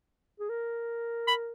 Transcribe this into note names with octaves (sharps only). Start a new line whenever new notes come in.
G#4
A#4
B5